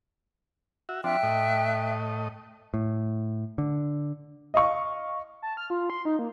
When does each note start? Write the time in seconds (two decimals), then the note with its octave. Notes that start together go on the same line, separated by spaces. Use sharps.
0.89 F#4 E5
1.04 F3 C4 D4 E5 G5 F#6
1.23 A2 D#5
2.74 A2
3.58 D3
4.54 D#5 F5 C#6
5.42 A5
5.57 F6
5.70 F4
5.90 C6
6.05 D#4
6.19 A#3